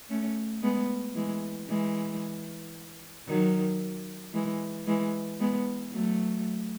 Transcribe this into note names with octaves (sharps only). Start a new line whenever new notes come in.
A3 C#4
G#3 B3
E3 G#3
E3 G#3
D#3 F#3
E3 G#3
E3 G#3
G#3 B3
F#3 A3